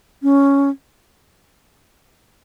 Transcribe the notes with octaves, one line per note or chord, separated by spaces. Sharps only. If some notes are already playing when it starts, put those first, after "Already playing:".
C#4